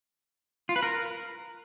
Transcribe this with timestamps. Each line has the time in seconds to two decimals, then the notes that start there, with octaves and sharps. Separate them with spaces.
0.69 F4
0.76 B4
0.83 A#4